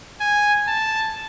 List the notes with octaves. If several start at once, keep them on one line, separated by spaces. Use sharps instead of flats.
G#5
A5